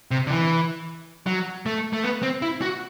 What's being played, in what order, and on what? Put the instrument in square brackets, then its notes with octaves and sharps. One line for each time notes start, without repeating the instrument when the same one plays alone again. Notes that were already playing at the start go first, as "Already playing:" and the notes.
[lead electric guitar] C3
D3
E3
F#3
A3
A3
B3
C4
E4
F#4